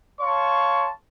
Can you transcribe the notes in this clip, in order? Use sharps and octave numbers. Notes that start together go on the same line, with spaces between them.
C#5 F5 A5 C6 C#6